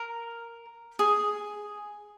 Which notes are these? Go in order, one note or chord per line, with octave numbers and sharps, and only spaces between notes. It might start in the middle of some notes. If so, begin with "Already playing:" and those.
Already playing: A#4
G#4